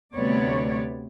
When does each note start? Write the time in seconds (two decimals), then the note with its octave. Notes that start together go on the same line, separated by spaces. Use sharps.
0.16 D2 C3 G3 B3 C#5 D5